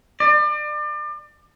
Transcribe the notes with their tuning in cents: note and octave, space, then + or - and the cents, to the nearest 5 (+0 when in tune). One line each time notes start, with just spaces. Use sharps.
D5 +35